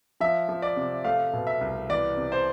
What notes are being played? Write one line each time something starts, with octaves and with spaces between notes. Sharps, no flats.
F3 E5
F3
D5
C3
A3 F5
B2
E5
C2
E3 D5
C3
C5